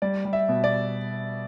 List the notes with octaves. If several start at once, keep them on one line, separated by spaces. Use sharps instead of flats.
G3 D5
G3
E5
B2
D5